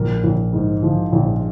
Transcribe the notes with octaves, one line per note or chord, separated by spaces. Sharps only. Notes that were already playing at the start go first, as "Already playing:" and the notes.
Already playing: A#1 A#4
A#1
G#2
F3
A#1